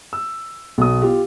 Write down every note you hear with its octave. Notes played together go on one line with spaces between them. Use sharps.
E6
B1 D#6
F4 G4